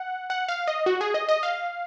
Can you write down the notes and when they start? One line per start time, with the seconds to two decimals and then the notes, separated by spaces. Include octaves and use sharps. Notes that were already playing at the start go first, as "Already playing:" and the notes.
Already playing: F#5
0.30 F#5
0.48 F5
0.68 D#5
0.86 F#4
1.01 G#4
1.14 D#5
1.28 D#5
1.43 F5